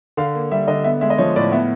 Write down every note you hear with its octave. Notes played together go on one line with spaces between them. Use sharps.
D3 F5
A#3
G3 E5
D3 D#5
B3 E5
G#3 E5
D#5
F3 C#5
A2 D5
B3 E5